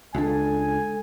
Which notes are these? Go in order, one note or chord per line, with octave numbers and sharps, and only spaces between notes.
C#2 G#3 D4 A4 G#5